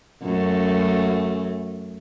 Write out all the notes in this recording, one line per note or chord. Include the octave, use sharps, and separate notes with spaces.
F#2 A3